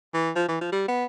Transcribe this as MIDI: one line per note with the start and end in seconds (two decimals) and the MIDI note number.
0.14 0.30 52
0.36 0.47 53
0.48 0.58 52
0.61 0.70 53
0.72 0.84 55
0.88 1.05 59